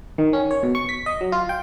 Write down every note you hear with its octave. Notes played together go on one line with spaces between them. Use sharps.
D#3
C#4
C#5
B2
C#6
B6
D#5
F#3
F4
G5